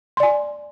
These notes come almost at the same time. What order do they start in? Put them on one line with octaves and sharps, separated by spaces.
C6 D5 G#5